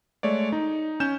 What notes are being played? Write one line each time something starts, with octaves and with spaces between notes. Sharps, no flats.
G#3 A3 C#5 D5
D#4
C#4 G6 E7